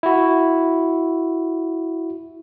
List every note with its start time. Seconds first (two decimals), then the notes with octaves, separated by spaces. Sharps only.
0.03 E4 F#4